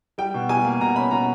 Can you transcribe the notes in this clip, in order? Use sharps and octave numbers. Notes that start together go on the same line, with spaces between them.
G3 G5
B2
G3 G#5
A#3
B2 A#5
C#4 B5
B2 A#5